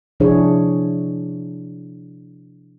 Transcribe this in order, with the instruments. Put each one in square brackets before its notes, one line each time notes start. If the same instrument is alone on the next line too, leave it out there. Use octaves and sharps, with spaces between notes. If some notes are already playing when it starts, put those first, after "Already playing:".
[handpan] C3 F3 D4 E4 G#4 C#5